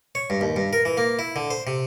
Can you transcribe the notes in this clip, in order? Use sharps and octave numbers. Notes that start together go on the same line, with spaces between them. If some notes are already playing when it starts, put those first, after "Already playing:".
C#5
G2
D#2
G2
A#4
E3
A#3
E4
D3
C5
C3